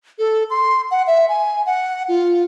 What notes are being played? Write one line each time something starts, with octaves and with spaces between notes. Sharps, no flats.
A4
C6
F#5
E5
G#5
F#5
F4